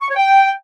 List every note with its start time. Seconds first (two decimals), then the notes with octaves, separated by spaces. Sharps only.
0.02 C#6
0.09 C#5
0.17 G5